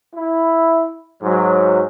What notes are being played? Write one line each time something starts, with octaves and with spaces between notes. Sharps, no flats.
E4
G#2 F#3